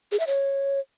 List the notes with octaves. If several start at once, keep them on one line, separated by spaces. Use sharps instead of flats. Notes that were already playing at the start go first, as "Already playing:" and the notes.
G#4
E5
C#5